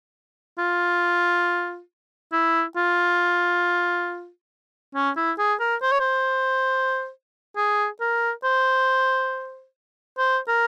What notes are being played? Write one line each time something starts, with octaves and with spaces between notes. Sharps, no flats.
F4
E4
F4
C#4
E4
G#4
A#4
C5
C#5
C5
G#4
A#4
C5
C5
A#4